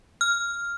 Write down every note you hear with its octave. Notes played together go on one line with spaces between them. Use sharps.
F6